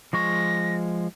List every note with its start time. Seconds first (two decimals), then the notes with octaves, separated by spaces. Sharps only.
0.13 F3 G#3 C#6 A#6